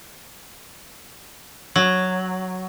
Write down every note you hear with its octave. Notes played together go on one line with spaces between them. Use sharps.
F#3